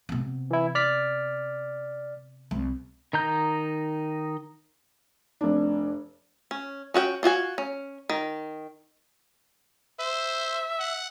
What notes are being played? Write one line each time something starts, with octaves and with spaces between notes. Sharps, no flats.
C3 B3
E3 E4
D5 F6 B6
C2
D#3 D#4 A#5 G6
F1 D4
C#4
C#4 F#4 F#5 G5
D4 F4 F#4 G#5
C#4
D#3
C5 E5
F#5